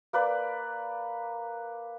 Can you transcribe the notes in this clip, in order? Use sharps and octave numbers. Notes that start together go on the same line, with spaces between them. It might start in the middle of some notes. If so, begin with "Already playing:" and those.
A#3 B4 D5